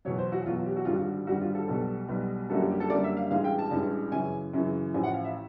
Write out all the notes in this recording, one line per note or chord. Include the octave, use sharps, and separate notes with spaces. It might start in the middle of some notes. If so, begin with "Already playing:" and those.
E2 B2 F#3 C#5
C5
F#4
E2 B2 F#3 F4
F4
G4
F#4
G#1 G2 D3 G3 F4
F#4
G#1 G2 D3 G3 F#4
F4
A4
B1 B2 G3 A4
B1 B2 G3
F#2 D3 G3 A#3 F#4 A4
G4
G4
A4
F#2 D3 G3 A#3 D5
E5
F5
A1 G2 E3 G#3 F5
G5
A5
A1 G2 E3 G#3
F#2 C#3 E3 G#5
F#2 C#3 E3
A1 A2 F3 G#5
F#5
F5
E5